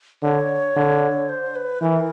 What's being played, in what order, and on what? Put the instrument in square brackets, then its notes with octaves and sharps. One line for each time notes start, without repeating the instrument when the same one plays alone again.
[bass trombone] D3 [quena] C#5
[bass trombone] D3
[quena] C5
B4
[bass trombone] E3 [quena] A#4